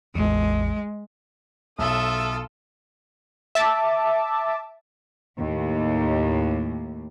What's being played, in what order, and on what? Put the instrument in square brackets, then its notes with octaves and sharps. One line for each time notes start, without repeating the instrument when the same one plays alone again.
[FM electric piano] A1 E2 [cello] G#3
[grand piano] B1 [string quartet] F4 A4 [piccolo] E5 [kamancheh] D#6
[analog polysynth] E5 A5 D6
[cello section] D#2 A2